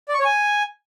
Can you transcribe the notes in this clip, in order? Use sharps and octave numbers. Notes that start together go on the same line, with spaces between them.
D5
C#6
C#5
G#5